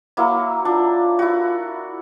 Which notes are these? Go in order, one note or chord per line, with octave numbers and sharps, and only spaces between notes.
F#3 A#3 E4
D4 F4
E4 F#4